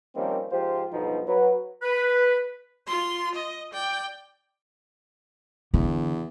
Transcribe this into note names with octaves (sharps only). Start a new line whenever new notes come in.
D#3 F3 G3 A#3 C4 C#4
G#2 F3 F4 G4 C5
B1 G2 B2 F3 D#4
F#3 B4
B4
F4 C6
D#5
D5 G5
E2 D3